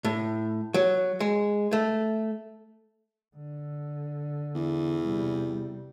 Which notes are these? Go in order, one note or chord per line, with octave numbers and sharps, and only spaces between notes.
A2
F#3
G#3
A3
D3
E2
C3 G3